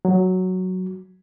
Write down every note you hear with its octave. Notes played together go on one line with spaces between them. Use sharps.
F#3